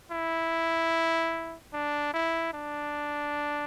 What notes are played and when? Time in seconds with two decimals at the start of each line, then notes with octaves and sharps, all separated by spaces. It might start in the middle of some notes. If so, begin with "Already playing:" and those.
0.11 E4
1.73 D4
2.14 E4
2.54 D4